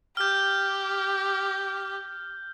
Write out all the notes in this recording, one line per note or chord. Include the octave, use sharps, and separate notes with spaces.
G4 F6 G6